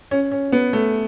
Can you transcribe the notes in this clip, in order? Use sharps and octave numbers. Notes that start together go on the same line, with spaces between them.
C#4
C#4
B3
A3